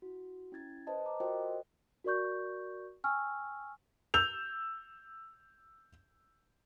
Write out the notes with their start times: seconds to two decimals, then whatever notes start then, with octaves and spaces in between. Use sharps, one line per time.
0.02 E4 F#4
0.52 C#4 E4 G#6 A6
0.87 B4 C5 D#5 A5
1.06 A#5 D6
1.20 F4 F#4 A#4 C5 D#5 G5
2.04 F#4 A#4 D5 C#6 G6
3.04 G5 G#5 C#6 E6 F6
4.14 E6 G6 F7